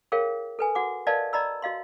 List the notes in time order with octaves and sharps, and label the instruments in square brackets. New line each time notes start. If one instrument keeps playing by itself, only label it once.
[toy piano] G#4 A#4 C#5 F5 G5
A4 B4 G#5
F#4 F#5 D6
A#4 B4 D5 D#5 F5 A5
D5 D#5 A#5 B5 E6
F#4 D#5 F5 C6